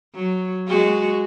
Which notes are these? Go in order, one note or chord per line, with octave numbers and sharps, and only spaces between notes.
F#3
G#3 F#4